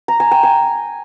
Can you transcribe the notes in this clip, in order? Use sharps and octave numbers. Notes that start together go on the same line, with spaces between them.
A#5
G#5
G5
G#5